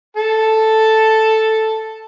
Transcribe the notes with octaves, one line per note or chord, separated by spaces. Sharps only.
A4 A5